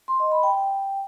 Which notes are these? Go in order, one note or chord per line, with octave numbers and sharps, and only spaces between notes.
C6
D#5
B5
G5